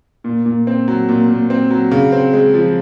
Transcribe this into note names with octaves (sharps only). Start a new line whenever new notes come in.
A#2
A#2
C4
F#3
A#2
A#2
C4
F#3
C#3
C4
G#3
F3